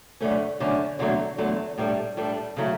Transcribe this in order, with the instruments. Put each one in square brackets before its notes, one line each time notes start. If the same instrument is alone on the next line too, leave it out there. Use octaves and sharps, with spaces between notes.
[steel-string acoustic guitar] F#2 D3 A3 C#4
F#2 D3 A3 C#4
E2 D3 F#3 A3
E2 D3 F#3 A3
A2 G3 D4 A4
A2 G3 D4 A4
C#3 F#3 A3 E4